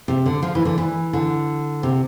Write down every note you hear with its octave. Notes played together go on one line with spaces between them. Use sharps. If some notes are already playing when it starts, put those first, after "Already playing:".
C3
D3
F3
E3
D3
E3
D3
C3